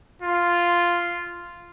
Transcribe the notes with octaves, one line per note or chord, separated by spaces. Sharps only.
F4